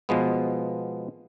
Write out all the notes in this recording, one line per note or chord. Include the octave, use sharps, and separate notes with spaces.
B2 F3 G#3 B3